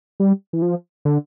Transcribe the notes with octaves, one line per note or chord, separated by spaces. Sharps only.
G3
E3
F3
D3